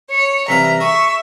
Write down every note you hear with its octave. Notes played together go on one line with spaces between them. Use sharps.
C#5 C#7
C2 E3 F5 A#5 B6
G#4 E5 C#6